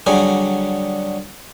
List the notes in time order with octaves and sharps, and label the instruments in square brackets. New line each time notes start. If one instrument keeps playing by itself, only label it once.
[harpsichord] D3 F#3 G3 G#4